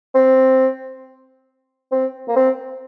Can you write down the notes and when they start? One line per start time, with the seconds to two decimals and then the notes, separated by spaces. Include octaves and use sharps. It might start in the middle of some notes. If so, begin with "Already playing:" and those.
0.15 C4
1.92 C4
2.28 A#3
2.36 C4